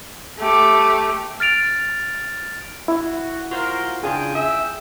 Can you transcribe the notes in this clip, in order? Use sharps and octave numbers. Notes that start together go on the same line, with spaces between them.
A3 G4
F6 A6 D7 F7
E4 F#4
F4 F#4 A#4 C5 F5
C#3 D4 F4 G#4 G5
G#4 E5